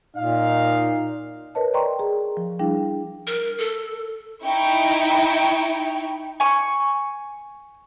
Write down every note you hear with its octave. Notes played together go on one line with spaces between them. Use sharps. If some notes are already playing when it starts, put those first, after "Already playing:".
A#2 D#4 F5
A#4 B4 C#5 D#5 A5
D5 D#5 G5 A#5 C6 C#6
G#4
F3
G3 D4 E4 G#4 F5 G5
A#4
A4
D#4 E4 G5 C#6
G#5 C#6